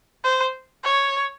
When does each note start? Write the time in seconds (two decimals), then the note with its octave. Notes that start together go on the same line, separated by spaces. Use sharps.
0.24 C5
0.84 C#5